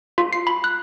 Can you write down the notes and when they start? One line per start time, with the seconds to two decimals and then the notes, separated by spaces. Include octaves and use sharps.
0.18 F4
0.33 C7
0.47 B5
0.64 F#6